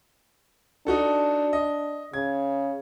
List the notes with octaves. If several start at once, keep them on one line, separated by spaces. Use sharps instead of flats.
D4 D#4 F#4 A4
D#5
C#3 G#6